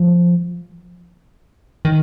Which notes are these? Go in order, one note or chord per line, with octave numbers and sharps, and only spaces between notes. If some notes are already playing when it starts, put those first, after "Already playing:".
Already playing: F3
D#3